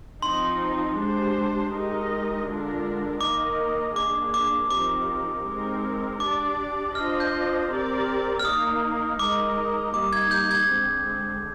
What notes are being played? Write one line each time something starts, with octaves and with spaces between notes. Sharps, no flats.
F3 C4 D#4 C6
G#3 D4 G4 C5
G#3 D#4 G4 A#4 D#5
D3 G#3 D4 F4 A#4
D#3 A#3 D#4 A#4 D#5 D6
A#3 D4 G#4 D6
D6
F3 C4 D#4 G4 A#4 D6
G#3 C4 D#4 A#4
D4 G4 D5 D6
D4 F4 C5 D#5 F6
G6
C4 G4 A#4 D5
F6
A#3 D#4 A#4 D#6
G#3 D#4 A#4 D#5 D6
G3 A#3 D#4 D6
G#6
G6
G#6
D3 G#3 C4